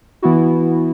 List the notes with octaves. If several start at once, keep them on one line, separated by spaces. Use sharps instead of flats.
E3 B3 E4 F#4